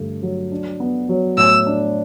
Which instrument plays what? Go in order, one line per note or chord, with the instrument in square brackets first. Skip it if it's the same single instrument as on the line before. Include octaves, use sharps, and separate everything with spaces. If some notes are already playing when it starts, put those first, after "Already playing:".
Already playing: [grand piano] G2 D3 A3
F#3
D4
B3
F#3
[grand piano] A2 [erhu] E6
[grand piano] D4